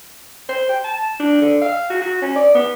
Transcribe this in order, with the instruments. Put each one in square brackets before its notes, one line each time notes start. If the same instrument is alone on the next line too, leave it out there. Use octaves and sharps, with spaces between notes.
[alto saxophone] C5
G5
A5
D4
D3
F5
F#4
F#4
C#4
D5
B3